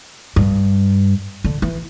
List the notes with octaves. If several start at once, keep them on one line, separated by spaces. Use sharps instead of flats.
G2
D3
E3